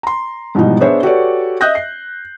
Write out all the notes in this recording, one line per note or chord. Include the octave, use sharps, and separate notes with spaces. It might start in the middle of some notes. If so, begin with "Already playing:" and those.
A#5 C6
G#2 B2 E3 F3 G3 D#4
B3 D4 G#4 C5 C#5 E5
F#4 G4 A4 B4 C#5 D5
D#5 E5 D#6 F#6 G6 A#6
C7